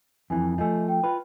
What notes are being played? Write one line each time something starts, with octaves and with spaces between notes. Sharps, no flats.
F2 E3 G#5
F3 A3 D#5 G#5
G5
F4 B4